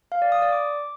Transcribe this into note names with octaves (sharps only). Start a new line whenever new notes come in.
F5
D5
D#6
D5
D6